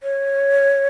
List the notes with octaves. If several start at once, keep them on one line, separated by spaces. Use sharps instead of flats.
C#5